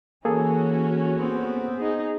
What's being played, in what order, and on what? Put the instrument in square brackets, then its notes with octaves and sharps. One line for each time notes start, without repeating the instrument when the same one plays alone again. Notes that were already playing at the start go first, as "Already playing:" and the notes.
[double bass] E3 [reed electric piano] A#3 G#4 A4 [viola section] C#4 F#4
[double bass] B3 C4
[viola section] D#4 G#4